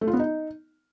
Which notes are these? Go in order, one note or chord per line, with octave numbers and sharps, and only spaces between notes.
A3
F4
B3
D#4